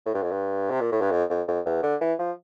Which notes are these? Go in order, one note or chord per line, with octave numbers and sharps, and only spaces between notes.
A2
G2
F2
G2
C3
A#2
A2
G2
F2
F2
F2
E2
D3
E3
F3